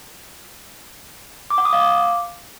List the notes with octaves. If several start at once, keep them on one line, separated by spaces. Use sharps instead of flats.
D6
F#5
D#6
F5
D6